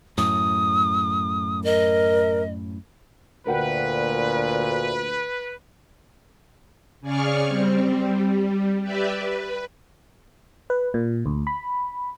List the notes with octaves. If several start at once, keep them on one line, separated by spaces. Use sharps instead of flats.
F#2 A2 D#6
A#4 D#5
D2 A#2 A#4 B4 F#5 G5
C#3 G#4 D5 C#6 F6
G3 C4
G3
G4 B4 D5 E5
B4
B4
A#2
D2
B5